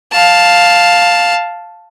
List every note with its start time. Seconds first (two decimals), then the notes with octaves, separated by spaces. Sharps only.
0.12 F5 A5